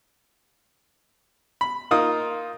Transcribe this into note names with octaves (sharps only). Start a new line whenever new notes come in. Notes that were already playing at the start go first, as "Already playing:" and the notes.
B5
A#3 D#4 F4 D#6